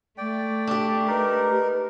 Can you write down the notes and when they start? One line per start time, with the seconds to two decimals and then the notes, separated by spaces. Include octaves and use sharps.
0.18 A3 D5 G5
0.67 D4 G4
1.08 D#4 A#4 B4